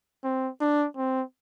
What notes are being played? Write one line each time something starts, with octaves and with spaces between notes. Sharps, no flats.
C4
D4
C4